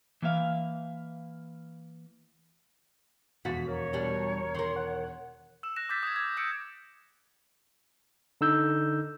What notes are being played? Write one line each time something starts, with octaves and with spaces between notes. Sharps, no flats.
E3 A#3 E5 F5
E1 F2 F#4 A6 B6
A#4 C#5
B2 G3 D4
D#3 A#4 C6
F#5
E6 E7
F#6 A#6 E7
D6 E6 G6 A6 B6
D#6 G#6
G#6
E6 G6 C#7 D7
D3 D#4 E6 G6